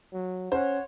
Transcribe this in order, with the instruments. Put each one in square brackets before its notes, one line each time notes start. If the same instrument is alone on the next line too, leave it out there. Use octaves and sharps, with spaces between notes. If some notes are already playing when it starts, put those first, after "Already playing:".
[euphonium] F#3
[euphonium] C#4 [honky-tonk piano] C5 [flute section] C#5 F#5